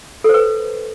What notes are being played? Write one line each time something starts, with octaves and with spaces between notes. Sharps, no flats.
A4 B4 C5